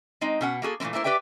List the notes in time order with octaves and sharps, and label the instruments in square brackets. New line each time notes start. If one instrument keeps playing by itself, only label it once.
[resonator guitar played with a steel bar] G#3 C4 D#4
B2 C#4 F#5
A#3 F#4 G#4 A4
A#2 E3 F#3 A3 C4
A3 A#3 E4 C5
G4 B4 D5 E5 G5